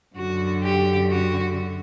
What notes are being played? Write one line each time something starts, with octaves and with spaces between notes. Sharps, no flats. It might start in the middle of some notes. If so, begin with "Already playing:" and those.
F#2 D3 F#4
G4
F#4